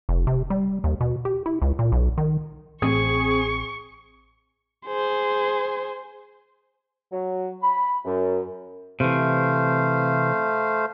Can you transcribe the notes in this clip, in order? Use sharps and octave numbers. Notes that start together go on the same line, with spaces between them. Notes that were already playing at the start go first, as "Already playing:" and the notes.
F1
C3
G3
D#2
B2
G4
E4
C#2
A#2
B1
D#3
A1 C4 G#4 C#6
G#4 C5
F#3
B5
F#2
C3 E3 A3 C5 F5